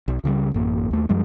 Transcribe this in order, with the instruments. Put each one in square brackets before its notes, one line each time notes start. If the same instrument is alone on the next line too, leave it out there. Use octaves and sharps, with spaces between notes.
[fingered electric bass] B1
C#2 C#3 F3 G3
A1 F#2 A#3
D#2 A3
F#2 F3 G3 G#3